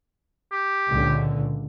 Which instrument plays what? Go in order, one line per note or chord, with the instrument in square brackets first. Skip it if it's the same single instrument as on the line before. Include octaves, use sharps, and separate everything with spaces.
[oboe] G4
[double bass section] C#2 A#2 D3